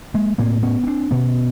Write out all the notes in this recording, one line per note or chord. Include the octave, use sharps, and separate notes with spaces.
G#3 A#3
A2 A#3 C4
B3 C#4
C#4
C4 D4
B2 B3 C#4